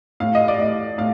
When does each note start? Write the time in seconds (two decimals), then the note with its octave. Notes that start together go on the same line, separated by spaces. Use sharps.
0.20 A2 F5
0.35 D#5
0.48 D5
0.59 A2 D#5
0.98 A2 F5